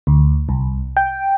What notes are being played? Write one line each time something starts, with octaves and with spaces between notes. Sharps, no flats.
D2
C2
G5